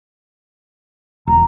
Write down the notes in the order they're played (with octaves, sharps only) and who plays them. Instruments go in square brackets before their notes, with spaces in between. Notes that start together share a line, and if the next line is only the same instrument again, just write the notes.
[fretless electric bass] E1 [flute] A#5